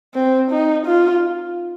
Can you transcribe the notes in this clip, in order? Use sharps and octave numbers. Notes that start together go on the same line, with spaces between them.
C4
D#4
F4